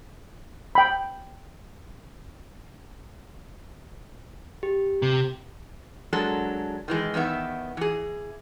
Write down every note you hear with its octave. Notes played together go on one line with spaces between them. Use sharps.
G5 B5
G4
C3
F#3 G#3 D4 A4 A#4
D#3 E3 G#3
E2 D#3 B3 E5
E3 G#4